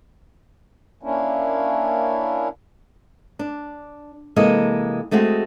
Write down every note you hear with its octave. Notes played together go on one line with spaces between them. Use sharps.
A#3 C#4 D4 E4
D4
C3 E3 G#3 A#3 A4 D#5
G#3 A3 C4 F#4 G#4